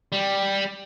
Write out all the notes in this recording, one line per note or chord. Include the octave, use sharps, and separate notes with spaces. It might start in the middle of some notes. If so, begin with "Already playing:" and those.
G3